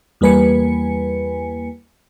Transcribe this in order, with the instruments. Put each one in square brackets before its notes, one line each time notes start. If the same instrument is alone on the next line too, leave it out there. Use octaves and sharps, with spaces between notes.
[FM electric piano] E2 G3 A#3 B4 G#5 C#7